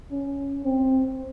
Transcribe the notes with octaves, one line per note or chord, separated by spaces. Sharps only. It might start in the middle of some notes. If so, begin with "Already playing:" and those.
C#4
C4